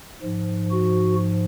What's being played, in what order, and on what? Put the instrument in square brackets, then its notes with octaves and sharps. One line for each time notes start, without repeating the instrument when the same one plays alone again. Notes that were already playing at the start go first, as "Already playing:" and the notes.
[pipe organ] G#2 F3
F#4